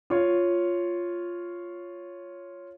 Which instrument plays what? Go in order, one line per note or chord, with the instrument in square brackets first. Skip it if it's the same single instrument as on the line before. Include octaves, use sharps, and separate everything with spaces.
[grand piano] F4 C#5